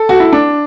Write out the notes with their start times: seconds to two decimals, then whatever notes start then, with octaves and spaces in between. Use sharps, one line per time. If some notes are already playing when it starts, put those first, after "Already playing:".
Already playing: A4
0.09 F#4
0.20 E4
0.33 D4